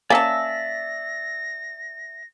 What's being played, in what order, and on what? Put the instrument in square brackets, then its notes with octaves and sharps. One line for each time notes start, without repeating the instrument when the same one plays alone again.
[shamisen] A#3 C#4 [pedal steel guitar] D5 E5 E6 [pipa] G#5 A5 [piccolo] A#6